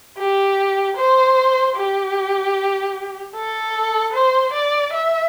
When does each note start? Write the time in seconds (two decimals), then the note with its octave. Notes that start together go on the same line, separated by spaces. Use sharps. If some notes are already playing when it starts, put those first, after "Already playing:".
0.18 G4
0.97 C5
1.76 G4
3.35 A4
4.13 C5
4.53 D5
4.93 E5